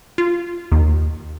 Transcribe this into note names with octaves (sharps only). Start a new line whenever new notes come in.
F4
D#2